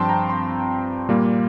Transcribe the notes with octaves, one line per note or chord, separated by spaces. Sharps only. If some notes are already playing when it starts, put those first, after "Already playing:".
Already playing: G2 F3 C4 G5 A5 C6
A#5
C6
A#2 G3 A#3